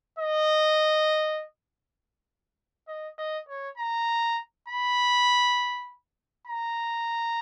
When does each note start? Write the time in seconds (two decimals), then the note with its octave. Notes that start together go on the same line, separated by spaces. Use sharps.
0.19 D#5
2.88 D#5
3.18 D#5
3.49 C#5
3.78 A#5
4.68 B5
6.48 A#5